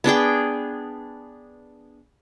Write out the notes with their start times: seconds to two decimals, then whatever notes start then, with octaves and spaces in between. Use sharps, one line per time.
0.04 B3 D4 G#4 G5